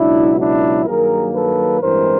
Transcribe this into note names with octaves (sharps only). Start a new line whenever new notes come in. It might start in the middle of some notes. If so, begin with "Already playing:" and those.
Already playing: C#2 B2 F#3 D4 E4
D4 E4
G2 D#3 F#3 A#3 G#4 A#4
A4 B4
A1 G2 E3 G#3 C4 A#4 C5